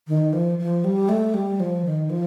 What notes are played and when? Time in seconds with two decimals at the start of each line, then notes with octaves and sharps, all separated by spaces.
0.08 D#3
0.33 F3
0.59 F3
0.84 G3
1.09 A3
1.34 G3
1.60 F3
1.85 D#3
2.10 F3